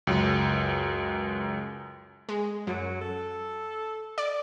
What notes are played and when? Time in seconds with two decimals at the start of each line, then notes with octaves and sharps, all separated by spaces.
0.07 C#2 F#2
2.29 G#3
2.67 F#2 F#3
3.01 A4
4.18 D5